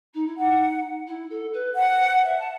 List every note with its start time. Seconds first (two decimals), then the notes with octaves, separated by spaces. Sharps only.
0.13 D#4
0.26 E4
0.37 D#4 F#5
1.06 E4
1.30 A4
1.53 B4
1.76 C5 F#5
2.00 C5
2.23 E5
2.38 A5